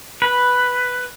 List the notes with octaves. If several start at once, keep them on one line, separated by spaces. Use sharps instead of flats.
B4